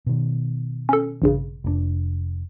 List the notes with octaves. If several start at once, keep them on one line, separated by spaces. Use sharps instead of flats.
B2 D#3
C#4 A4
A1 G2 C#3
F1 B2 D4